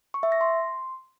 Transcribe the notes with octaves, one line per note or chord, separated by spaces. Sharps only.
C#6
E5
A#6
C6